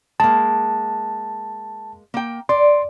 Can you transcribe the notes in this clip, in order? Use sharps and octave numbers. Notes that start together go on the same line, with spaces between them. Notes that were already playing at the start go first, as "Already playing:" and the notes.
G#3 A#3 A5
A#3 G5
D5 C6